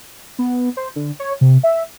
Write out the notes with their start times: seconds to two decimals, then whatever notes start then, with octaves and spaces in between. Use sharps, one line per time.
0.39 B3
0.77 C5
0.96 D3
1.20 C#5
1.41 C3
1.63 E5